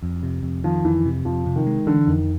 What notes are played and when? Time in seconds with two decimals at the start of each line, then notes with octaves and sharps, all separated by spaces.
0.03 F2
0.23 C3
0.43 F2
0.64 D#3 F3
0.85 F2 E3
1.05 C3
1.25 F2 F3
1.47 C3
1.56 D#3
1.67 G#3
1.87 D3 E3
2.07 F2 D#3